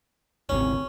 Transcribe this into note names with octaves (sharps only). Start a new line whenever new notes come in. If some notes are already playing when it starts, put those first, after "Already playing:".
D1 G#1 C3 C#4